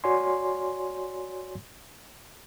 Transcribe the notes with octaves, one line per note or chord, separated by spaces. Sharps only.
F#4 C#5 D5 G#5 C6